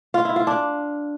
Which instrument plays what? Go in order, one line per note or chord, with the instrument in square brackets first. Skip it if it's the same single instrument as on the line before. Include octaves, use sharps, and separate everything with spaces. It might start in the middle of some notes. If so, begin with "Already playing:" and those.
[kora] F4
E4
F4
D4